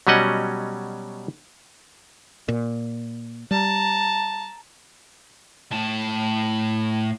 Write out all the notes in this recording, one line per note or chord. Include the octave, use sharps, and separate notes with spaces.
B2 F#3 G3 C#4 D#5 F#5
A#2
G3 A5 A#5
A2 A5